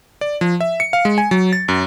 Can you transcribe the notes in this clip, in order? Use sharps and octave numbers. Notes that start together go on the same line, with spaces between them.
D5
F3
E5
C#7
F5
G#3
G#5
F#3
A6
F#2